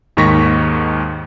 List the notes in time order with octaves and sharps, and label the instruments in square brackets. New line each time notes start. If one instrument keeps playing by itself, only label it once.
[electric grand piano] D#2 G#2 D#3 C#6 A#6 B6